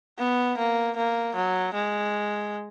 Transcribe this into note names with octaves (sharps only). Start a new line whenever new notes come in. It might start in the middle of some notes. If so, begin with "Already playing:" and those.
B3
A#3
A#3
F#3
G#3